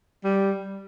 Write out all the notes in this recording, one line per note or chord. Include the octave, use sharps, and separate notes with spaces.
G3